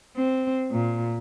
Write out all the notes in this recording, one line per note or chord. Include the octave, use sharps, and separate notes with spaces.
C4
A#2